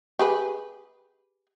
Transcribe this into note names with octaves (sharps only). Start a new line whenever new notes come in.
G4 G#4 B4